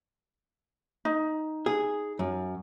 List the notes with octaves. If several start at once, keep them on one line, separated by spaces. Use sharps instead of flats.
D#4
G#4
F#2